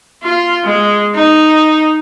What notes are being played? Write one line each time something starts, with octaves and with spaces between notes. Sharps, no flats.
F4
G#3
D#4